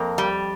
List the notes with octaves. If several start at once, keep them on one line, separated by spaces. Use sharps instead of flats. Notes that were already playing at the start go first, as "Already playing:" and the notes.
Already playing: F2 A#3
G3